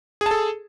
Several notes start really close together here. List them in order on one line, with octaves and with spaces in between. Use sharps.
G#4 A5 A4